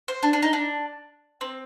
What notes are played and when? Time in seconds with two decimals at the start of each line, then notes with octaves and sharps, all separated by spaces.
0.08 C5
0.23 D4
0.33 D4
0.42 D#4
0.53 D4
1.41 C4